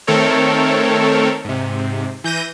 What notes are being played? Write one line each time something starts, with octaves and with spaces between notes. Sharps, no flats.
D#3 A3 C4 A4 A#4 C#5
G#2 C3
E3 G6 A#6 D#7